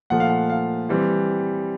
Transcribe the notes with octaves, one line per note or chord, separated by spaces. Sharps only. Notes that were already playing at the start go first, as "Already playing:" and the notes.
A#2 F3 A3 F#5
F5
F#5
F5
E3 G3 C4